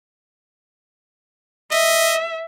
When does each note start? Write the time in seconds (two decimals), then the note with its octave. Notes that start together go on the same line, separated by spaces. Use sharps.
1.71 D#5 E5